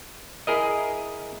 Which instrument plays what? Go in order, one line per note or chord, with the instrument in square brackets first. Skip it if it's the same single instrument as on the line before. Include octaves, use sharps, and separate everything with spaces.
[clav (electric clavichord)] E4 G#4 A#4 D#5